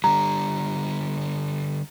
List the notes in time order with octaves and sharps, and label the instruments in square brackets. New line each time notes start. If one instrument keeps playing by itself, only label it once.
[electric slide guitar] D3 G3 [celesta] A#5